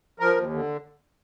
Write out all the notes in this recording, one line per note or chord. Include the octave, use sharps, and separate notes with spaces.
F3 A#4
D#2
D3